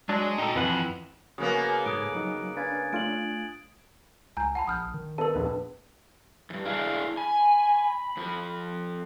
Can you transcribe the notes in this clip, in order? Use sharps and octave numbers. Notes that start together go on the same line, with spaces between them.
F#3 G#3 D4
D#4 F#4 A4 G5
F2 E3 B4 F#5
C#3 A#3 B3 F#4 F5 D#6 F#6
G#2 A4 D#6 F#6 G#6 D7
F#3 D#4 F#4
D4 B4 F5 G#5 G#6 A6
A3 D4 F4 D7 F#7
C#2 G#5 A#5 G6
F#5 A5 B5
A#1 D#6 F6 G6
D#3
B3 A4 A#4 A5
A#1 D#2 B3
E2 G2
D4 E4 G#4 F5
G#5 B5
F2 F3